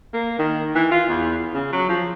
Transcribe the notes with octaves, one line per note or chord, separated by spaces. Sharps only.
A#3
D#3
E3
F4
E2
C#3
F#3
F3